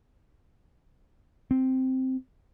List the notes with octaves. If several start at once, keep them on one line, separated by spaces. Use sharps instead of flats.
C4